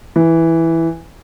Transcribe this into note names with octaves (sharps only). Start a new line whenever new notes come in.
E3